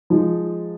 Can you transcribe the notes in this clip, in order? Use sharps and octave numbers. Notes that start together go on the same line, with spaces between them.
F3 G#3 D#4